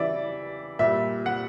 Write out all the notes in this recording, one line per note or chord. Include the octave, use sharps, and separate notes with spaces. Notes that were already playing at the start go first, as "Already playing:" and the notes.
Already playing: C#3 E3 G3 D5 E5
A#2 G3 E5
F#5